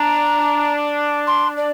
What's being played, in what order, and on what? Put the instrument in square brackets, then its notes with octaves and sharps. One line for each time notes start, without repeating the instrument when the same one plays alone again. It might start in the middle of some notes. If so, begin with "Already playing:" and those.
Already playing: [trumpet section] D4 [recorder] A#5
[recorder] C6
D5